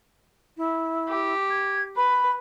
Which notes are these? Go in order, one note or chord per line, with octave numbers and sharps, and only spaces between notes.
E4
G4
G#6
B4 B5